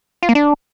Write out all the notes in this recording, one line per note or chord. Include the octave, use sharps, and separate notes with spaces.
F4
A#3
D4